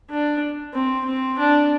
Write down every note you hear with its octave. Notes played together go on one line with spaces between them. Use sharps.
D4
C4
C4
D4